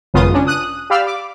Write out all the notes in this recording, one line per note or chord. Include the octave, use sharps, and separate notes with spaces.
G#1 F#2 C#3 B3 F4 D#6
C#4 D4
D#6 F#6 D#7
G4 D5 F5 B5 E6 F6
D6